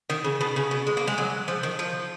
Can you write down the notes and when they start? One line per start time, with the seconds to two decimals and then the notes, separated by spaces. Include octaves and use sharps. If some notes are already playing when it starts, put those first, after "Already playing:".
0.10 D#3
0.24 C#3
0.41 B2
0.56 C#3
0.71 B2
0.87 G#3
0.97 A#3
1.07 G#3
1.18 F#3
1.48 F3
1.63 D#3
1.79 F3